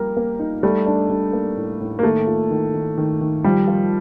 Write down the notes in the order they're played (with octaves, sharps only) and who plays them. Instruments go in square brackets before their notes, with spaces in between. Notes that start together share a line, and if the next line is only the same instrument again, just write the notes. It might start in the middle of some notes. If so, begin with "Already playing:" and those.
Already playing: [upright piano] F3 A#3 A#4 [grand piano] G3
[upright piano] A#3
D#4
[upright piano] G3 [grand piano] A3
[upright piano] D4
G3
A#3
A2
A2
[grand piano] A#3
[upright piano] D#3 [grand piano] A3
[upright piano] F4
D#3
D#3
D#3
D#3
[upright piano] F3 [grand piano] G3
[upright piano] F4